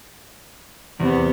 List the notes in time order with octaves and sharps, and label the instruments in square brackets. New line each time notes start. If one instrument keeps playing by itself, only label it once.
[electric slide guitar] E2 [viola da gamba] C3 B3